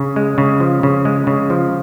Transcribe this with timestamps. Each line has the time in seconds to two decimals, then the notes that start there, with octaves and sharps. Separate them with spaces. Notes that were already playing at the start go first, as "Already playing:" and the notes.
Already playing: C#3 C#4
0.16 G#3
0.38 C#3
0.60 F3
0.83 C#3
1.05 G#3
1.27 C#3
1.50 F3